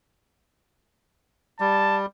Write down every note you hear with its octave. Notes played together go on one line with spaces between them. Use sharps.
G3 A5